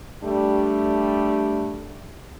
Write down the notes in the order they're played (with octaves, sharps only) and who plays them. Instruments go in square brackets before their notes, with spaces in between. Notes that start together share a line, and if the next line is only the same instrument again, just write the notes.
[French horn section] G3 A3 D4